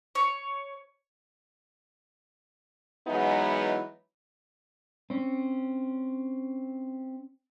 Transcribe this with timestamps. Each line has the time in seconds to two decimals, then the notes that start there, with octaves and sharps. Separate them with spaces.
0.15 C#5
3.07 E3 F#3 G#3 B3 D#4 E4
5.10 C4 C#4